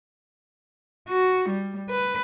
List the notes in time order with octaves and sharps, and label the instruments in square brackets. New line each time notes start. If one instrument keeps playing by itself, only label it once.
[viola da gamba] F#4
G3
B4